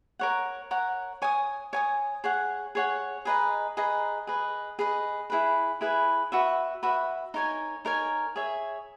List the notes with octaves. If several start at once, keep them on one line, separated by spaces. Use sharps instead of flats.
A#4 C#5 F#5
A#4 C#5 F#5
C#5 G#5 D#6
C#5 G#5 D#6
G#4 C#5 F#5
G#4 C#5 F#5
G#4 B4 D#5 A#5
G#4 B4 D#5 A#5
G#4 B4 D#5
G#4 B4 D#5
E4 G#4 B4
E4 G#4 B4
F#4 B4 E5
F#4 B4 E5
D#4 A#4 C#5 G#5
D#4 A#4 C#5 G#5
G#4 C#5 E5